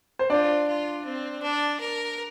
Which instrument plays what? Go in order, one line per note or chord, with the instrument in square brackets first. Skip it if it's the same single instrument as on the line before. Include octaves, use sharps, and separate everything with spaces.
[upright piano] C5
[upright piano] D4 D5 [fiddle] F4
[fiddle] F4
C4
D4
A#4